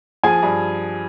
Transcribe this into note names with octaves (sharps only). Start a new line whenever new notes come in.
F3 G#4 G#5
G2